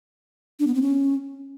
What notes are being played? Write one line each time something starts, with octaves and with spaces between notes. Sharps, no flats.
D4
B3
C4
C#4